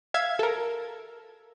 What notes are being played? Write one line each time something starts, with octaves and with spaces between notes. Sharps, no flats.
E5 F5 G#6
A4 A#4